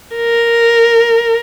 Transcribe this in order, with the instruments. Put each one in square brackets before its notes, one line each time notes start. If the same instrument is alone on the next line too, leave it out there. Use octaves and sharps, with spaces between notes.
[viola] A#4